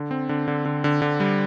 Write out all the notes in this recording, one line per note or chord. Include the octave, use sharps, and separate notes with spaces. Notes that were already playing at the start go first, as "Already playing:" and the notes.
Already playing: D3
C4
D3
D3
D3
D3
D3
G3